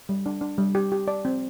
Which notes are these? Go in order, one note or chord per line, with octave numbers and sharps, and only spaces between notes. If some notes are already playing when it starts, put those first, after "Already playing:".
G3
D4
D4
G3
G4
G4
D5
C4